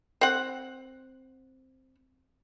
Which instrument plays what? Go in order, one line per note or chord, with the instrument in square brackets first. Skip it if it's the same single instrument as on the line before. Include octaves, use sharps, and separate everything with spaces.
[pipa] C4 F#5